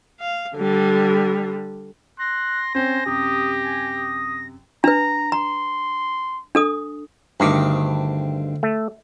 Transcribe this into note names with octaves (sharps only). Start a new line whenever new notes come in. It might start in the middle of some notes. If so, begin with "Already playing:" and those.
F5
D3 G3
C6 F#6 A#6
C4 C#4 C5 G#5
F#2 C3 G4 D#6
G#5
D#6
D4 B4 A#5
A#5 C6
D4 A4 D#6
D2 G2 D#3 C4 D6
A3